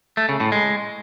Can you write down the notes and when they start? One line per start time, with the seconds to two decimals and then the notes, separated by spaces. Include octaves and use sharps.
0.17 A3
0.29 C#3
0.40 A2
0.52 G#3